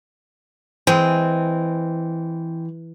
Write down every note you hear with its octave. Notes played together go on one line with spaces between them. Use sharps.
E3 G#3 C4